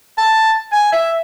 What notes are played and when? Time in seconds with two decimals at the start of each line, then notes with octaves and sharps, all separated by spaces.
0.18 A5
0.72 G#5
0.93 E5